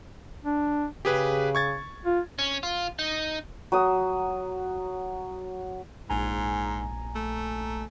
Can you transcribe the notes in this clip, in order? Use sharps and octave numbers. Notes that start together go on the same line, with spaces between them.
D4
C#3 G4 G#4 B4
C#6 G#6 A6
F4
C#4
F4
D#4
F#3 D#6
A#1 G#2 G#5 A#5
A3